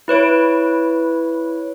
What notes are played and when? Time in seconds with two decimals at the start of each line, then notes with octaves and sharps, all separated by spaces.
0.08 E4 B4 C#5 D7